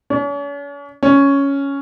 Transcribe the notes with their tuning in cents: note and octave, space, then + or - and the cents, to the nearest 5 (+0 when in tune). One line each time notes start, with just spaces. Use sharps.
C#4 +45
C#4 +5